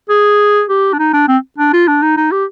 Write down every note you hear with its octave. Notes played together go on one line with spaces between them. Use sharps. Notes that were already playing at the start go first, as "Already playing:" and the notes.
G#4
G4
D4
D#4
D4
C4
D4
F4
D4
D#4
D#4
G4